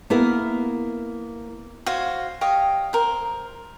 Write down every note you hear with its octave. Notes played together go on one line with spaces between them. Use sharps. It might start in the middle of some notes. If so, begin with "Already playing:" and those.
A#3 B3 E4 A#4
F#4 C5 C#5 F5
G4 C#5 D#5 F5
A#4 C5